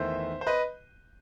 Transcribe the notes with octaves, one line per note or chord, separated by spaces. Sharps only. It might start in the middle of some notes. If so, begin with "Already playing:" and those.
Already playing: E2 D#3 A3 C5 E5
C5
B4 D#5